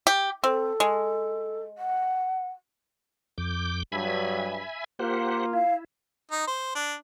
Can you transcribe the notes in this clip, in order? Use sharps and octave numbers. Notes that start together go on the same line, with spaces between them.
G4
C4 A4
G#3
F#5
F2 D6 G6
G2 F#3 E5 G#5 B5
A#3 F4 G4 C5 F#5
E4 F5
D#4
C5
D4